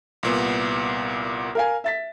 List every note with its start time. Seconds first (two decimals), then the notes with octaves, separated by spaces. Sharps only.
0.23 C2 A#2 B3
1.55 A#4 F5 G#5
1.84 E5 A6 B6